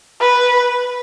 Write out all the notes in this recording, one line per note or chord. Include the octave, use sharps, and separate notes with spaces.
B4